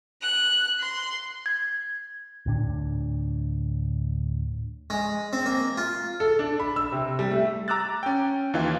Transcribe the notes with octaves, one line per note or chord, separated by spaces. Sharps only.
F#6
C6
G#6
D2 A2 D4
G#3
C4
A#3
F4
A4
D4
B5
E6
C3
G3
A3
A#5 D6 E6 F#6 A6
C#4 G5
D#2 E3 D#4 F4 F5